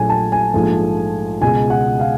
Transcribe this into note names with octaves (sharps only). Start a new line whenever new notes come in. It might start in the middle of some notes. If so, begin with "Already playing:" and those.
Already playing: A#1 A#2 F#3 A3 G#5
A5
G#5
A#1 G#2 F3 A3
C#2 B2 G#3 G#5
F#5
F5